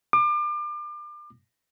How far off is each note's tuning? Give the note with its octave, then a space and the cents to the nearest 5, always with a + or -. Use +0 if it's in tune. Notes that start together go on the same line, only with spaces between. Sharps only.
D6 +35